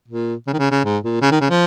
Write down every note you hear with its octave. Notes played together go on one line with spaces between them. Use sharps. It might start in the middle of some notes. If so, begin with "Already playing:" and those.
A#2
C#3
D#3
C#3
C#3
G#2
A#2
C#3
D#3
C#3
F3